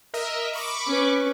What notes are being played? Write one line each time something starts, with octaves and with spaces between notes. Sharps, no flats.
A#4 D#5 E5
B5 C#6 D6
C#4 B4